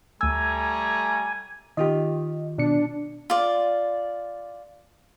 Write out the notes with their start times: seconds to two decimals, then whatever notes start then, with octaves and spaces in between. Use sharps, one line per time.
0.21 D2 G3 A3 G#5 A#5 E6
1.77 D#3 F4 G4 D#5
2.58 B2 D4 C#7
3.30 F4 D5